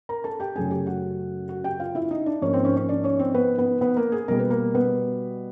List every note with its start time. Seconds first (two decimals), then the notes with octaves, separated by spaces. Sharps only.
0.09 A#4 A#5
0.24 A4 A5
0.40 G4 G5
0.56 F#2 C#3 F#3 A3 G#4 G#5
0.71 G4 G5
0.86 F#4 F#5
1.49 F#4 F#5
1.64 G4 G5
1.80 F4 F5
1.95 E4 E5
2.11 D#4 D#5
2.26 D4 D5
2.42 G#2 F3 A#3 C#4 C#5
2.53 C4 C5
2.65 C#4 C#5
2.76 C#4 C#5
2.89 D4 D5
3.04 C#4 C#5
3.19 C4 C5
3.34 B3 B4
3.58 B3 B4
3.81 B3 B4
3.96 A#3 A#4
4.12 G#4
4.28 B2 G3 A#3 A#4
4.39 B4
4.50 A#3 A#4
4.75 B3 B4